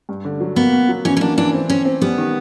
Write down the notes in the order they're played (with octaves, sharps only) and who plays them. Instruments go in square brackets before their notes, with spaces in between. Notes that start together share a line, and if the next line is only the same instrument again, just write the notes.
[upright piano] G2
D3
F#3
[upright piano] A#3 [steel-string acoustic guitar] B3
[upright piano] B2
F#3
[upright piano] E3 [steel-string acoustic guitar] C#4
[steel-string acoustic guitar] C#4
[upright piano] A#3 [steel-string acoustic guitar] D4
[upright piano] E3 [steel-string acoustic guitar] D4
[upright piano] C4
[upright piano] C4 [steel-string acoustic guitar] C#4
[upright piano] C4
[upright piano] G3 [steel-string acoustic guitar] B3
[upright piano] D#3